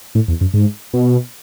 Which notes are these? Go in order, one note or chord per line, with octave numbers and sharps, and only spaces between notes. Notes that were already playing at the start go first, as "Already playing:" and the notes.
A2
E2
F#2
G#2
B2